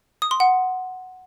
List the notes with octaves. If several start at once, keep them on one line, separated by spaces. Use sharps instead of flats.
D#6
C6
F#5